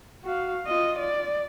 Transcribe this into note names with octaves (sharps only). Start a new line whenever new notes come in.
F#4 F5
F4 D#5
D5